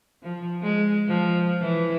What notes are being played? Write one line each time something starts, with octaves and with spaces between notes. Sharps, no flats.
F3
G#3
F3
E3